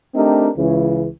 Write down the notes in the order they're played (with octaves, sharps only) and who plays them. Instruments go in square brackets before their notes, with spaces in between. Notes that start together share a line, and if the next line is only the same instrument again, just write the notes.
[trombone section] A3 C4 D4 D#4 G4 A#4
C#2 C#3 E3